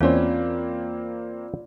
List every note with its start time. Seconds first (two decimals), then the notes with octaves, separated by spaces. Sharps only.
0.01 E2 A#3 C4 C#4 F4 C5 D5